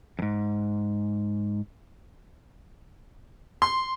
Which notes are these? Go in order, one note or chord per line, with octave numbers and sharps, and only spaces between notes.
F2 G#2
C6